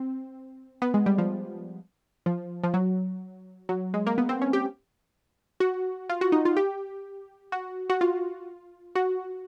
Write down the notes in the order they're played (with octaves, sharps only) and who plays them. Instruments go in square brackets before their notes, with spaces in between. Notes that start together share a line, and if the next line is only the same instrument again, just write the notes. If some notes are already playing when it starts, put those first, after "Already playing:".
Already playing: [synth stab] C4
B3
G#3
G3
F3
F3
F3
F#3
F#3
G#3
A#3
B3
C4
C#4
G4
F#4
F4
F#4
D#4
F4
G4
F#4
F#4
F4
F#4